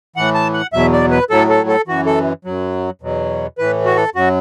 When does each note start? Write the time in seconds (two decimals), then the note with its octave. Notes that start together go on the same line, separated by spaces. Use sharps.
0.16 A2 E3 F#5
0.34 A5
0.54 F#5
0.73 E2 B2 F#3 E5
0.93 D5
1.11 B4
1.30 A2 F#3 A4
1.49 A4
1.68 A4
1.87 F#2 E3 F#4
2.06 A4
2.45 F#2 F#3
3.01 E2 B2 F#3
3.58 A2 E3 B4
3.85 F#4
3.96 A4
4.15 F#2 F#3 F#4